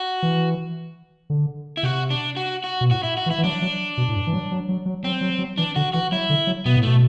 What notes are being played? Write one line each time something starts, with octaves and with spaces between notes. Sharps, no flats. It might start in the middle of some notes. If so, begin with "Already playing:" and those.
Already playing: F#4
E3
D3
E4
C3 F#4
D4
F#4
F#4
B2
A2 F#4
E4
F#4
E3
E4
E3
F#3 D4
F#3
B2
A2
G2
E3
F#3
F#3
F#3
F#3
F#3 C4
F#3
F#3
E3 D4
D3 F#4
E3 F#4
F#3 E4
D3
F#3
B2 B3
A2
B2 A3